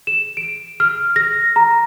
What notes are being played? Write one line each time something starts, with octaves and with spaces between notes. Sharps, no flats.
E7
D7
F6
A#6
A#5